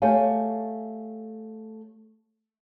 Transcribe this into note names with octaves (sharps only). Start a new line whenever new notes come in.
A3 G4 C#5 F5 G5 G#5